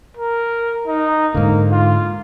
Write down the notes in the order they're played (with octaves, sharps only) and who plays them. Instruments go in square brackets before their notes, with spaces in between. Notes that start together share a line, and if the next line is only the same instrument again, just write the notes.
[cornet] A#4
D#4
[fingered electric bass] G#2 D3 [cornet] A#3
[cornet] F4